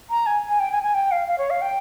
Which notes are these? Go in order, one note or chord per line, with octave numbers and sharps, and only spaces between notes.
A#5
G#5
G#5
G5
G#5
G#5
G5
F5
F5
C#5
F5
G5